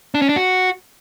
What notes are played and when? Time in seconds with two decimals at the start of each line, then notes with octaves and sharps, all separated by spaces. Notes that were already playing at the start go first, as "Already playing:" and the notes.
0.15 D4
0.22 C#4
0.29 D4
0.36 F#4